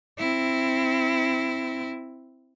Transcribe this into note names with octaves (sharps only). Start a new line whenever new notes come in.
C4 E4